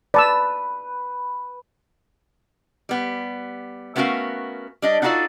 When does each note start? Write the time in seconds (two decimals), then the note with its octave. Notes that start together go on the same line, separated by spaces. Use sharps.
0.14 B4 D5 A5 E6
2.89 G3 B3
3.96 A3 B3 C#4 F#4 A#4 F5
4.82 G3 D4 D#5
5.02 D4 D#4 F4 F#4 A4 D5